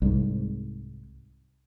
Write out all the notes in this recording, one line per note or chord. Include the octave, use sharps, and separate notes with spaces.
C2 G#2